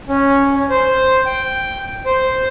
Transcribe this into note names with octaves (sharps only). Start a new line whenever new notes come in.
C#4
C5
G5
C5